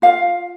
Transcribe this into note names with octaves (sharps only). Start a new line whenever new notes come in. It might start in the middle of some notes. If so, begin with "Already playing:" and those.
F4 F5